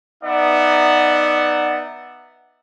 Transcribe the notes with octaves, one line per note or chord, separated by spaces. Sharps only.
B3 D#4 D5 E5 F#5